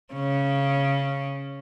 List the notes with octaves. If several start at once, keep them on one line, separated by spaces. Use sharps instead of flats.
C#3 C#4